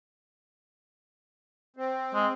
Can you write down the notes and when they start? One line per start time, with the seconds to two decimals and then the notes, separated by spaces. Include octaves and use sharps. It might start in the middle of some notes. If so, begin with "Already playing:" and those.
1.77 C4
2.14 G#3